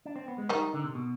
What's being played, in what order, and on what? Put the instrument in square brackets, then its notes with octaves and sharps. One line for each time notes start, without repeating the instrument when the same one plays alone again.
[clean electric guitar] D4
C4
B3
G#3
[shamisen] D#3 D#4 [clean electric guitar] G3
[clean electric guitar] D3
C3
B2